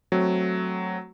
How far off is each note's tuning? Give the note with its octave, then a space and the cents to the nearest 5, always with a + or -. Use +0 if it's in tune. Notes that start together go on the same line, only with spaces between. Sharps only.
F#3 +0 A3 +0 C4 +0